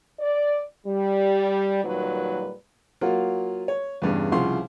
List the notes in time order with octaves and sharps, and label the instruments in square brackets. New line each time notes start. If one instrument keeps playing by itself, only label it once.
[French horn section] D5
G3
A#2 D#3 F#3 G3 B4
[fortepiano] F#3 A#3 F4 F#4
C#5
E2 G2 C#3
C2 C#3 F3 F#5 C6